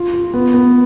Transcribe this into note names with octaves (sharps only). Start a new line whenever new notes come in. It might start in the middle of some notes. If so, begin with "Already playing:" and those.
Already playing: F4
F4
B3
B3